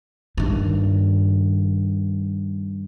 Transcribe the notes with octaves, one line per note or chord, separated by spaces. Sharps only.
G2 D#3